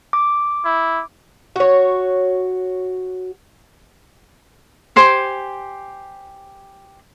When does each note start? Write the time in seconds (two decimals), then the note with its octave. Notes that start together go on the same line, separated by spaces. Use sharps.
0.13 D6
0.65 E4
1.56 F#4 C#5
4.96 G4 C5 G#5 D6